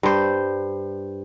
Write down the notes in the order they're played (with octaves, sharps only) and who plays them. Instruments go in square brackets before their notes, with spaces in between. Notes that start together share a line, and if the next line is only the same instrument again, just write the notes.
[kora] G2 C5